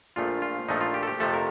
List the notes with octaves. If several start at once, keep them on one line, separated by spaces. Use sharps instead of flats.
A#1 A#2 F3 A3 F4
F4
A#1 A#2 F3 A3 D#4
F4
G4
A4
G4
F2 C3 F3 A3 A4
A#4